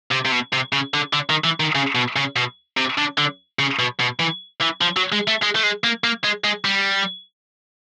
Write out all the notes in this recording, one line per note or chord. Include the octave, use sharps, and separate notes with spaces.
C3
C3
B2
C3
C#3
D3
D3
D#3
E3
D#3
C#3
B2
C#3
B2
C3
D3
D3
C#3
B2
B2
E3
E3
F3
F#3
G#3
A3
G#3
A3
G#3
A#3
A#3
G#3
G#3
G3